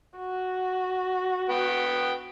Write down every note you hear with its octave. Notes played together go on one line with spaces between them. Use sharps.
F#4
B3 B4 G5